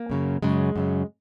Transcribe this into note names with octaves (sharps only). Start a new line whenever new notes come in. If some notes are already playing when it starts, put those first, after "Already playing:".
Already playing: A#3
F#2 C#3 F#3
F#2 C#3 F#3 G#3
F#2 C#3 F#3